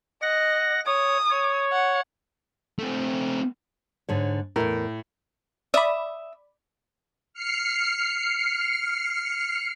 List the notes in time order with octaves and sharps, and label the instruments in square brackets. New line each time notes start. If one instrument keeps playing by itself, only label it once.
[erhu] D#5 [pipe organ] F#5 A#6
[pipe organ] C#5 [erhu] D#6
[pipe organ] C#5
[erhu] F#5
[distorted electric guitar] A3 C4
[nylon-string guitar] G#2 D3 C#5
[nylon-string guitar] E2 A#4 [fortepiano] A2
[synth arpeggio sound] D5 B5 [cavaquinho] E5 D#6
[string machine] F6 C7 C#7